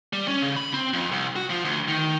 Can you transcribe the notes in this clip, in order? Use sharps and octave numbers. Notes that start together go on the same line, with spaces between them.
G3
C#4
C#3
B5
C4
F2
C2
F#4
F3
D2
D#3